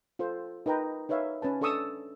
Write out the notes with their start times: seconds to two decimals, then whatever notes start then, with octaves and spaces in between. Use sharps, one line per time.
0.19 F4 A4 C5
0.66 D#4 A#4 B4 G5 A#5
1.09 D#4 B4 C#5 E5 F5
1.42 C#4 B4 A5
1.61 D4 A4 A5 C#6 D#6 E6